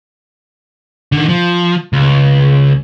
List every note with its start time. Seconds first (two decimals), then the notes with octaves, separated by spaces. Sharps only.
1.12 D3 D#3
1.29 F3
1.93 C#2